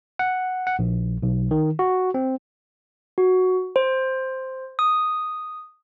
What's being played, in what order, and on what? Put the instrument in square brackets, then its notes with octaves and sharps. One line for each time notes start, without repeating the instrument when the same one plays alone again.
[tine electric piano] F#5
F#5
A#1
B1
D#3
F#4
C4
[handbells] F#4
C5
D#6